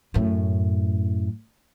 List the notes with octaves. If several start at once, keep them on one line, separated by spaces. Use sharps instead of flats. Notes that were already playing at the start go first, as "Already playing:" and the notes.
F#2 A2